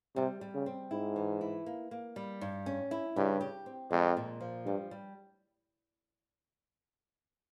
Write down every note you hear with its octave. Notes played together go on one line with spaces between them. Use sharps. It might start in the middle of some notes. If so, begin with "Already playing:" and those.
C3 G3
G3
C#3
C4
G#2 E4
E3
E4
A#3
A#3
G3
G2
C#4
E4
G2 C#3
G4
C4
F2 G#3
A#2
F3
G2 G3
G3